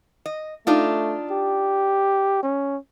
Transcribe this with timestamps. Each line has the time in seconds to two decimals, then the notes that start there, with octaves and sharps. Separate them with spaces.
0.26 D#5
0.67 A3 D4 D#4 F4
1.31 G4
2.43 C#4